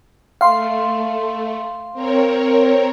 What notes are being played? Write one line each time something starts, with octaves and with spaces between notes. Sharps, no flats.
A3 F5 C6
C4 A#4 C#5